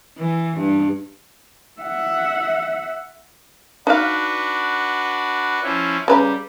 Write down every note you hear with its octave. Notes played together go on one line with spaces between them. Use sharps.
E3
G2
E5 F#5
D4 D#4 F#4 B4 F5
F3 C#4 E4
C#3 G3 B4 A#5